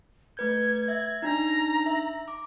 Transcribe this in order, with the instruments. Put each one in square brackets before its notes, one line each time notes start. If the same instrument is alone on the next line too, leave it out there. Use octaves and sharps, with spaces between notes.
[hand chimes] A3 B4 G6 [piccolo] G#6
[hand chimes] E5
[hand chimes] D4 D#4 [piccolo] A#5
[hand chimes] E5
D6